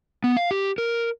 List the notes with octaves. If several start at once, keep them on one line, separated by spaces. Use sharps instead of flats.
B3
F5
G4
A#4